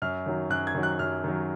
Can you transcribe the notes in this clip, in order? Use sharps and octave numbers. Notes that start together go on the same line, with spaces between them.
F#2 F6
D#3 F#3
F#2 F#6
G#6
D#3 F#3
F#6
F#2 F6
D#3 F#3